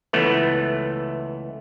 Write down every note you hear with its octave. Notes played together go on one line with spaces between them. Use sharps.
C#2 E3 A3 B3